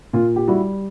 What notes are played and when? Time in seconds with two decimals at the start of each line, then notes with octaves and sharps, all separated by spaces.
0.13 A#2 F4
0.36 G4
0.48 G3 E4 F#4